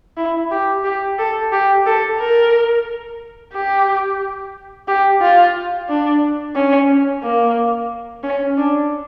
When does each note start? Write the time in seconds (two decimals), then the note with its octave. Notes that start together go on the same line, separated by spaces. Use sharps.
0.17 E4
0.51 G4
0.85 G4
1.18 A4
1.52 G4
1.86 A4
2.19 A#4
3.53 G4
4.88 G4
5.21 F4
5.89 D4
6.55 C#4
7.23 A#3
8.23 C#4
8.57 D4